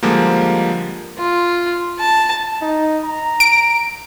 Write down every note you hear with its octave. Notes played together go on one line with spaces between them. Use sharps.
D3 F3 G3 G#3 A#3
F4
A5
D#4
A#5
D7